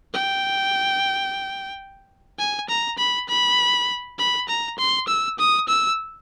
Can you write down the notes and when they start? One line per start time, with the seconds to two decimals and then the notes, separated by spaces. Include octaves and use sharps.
0.14 G5
2.39 G#5
2.69 A#5
2.98 B5
3.29 B5
4.19 B5
4.48 A#5
4.78 C6
5.08 E6
5.39 D#6
5.68 E6